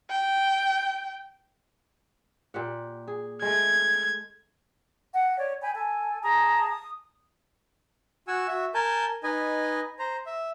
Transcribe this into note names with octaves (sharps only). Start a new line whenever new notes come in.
G5
A#2 G4 F#5
G#4
G#3 A3 G#6
F#5
C#5 D5
G5 G#5 B5
A4 G#5
G#4 A5 A#5 D#6
D#6
F#4 F#5 G#5 E6
F#4 E5
A#4 G#5 A5 G6
D#4 B4 D#5 G#5
C5 A#5
E5